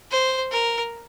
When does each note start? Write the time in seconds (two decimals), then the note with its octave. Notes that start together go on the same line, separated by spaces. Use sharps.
0.11 C5
0.51 A#4